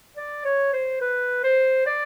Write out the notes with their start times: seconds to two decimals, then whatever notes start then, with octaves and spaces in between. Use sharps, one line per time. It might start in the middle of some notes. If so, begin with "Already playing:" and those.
0.16 D5
0.45 C#5
0.73 C5
1.01 B4
1.43 C5
1.86 D5